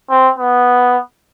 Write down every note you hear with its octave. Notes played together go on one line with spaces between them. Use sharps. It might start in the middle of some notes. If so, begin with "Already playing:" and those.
C4
B3